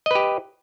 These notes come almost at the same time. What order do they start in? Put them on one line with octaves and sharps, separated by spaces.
D#5 B4 G4